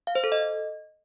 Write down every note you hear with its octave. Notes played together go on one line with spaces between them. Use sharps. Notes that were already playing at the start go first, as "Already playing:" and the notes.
F5
C5
A4
D#5